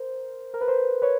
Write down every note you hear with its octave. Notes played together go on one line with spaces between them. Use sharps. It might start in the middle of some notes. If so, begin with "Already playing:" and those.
Already playing: A#4 C5
A#4
B4
A#4 C5
B4 C#5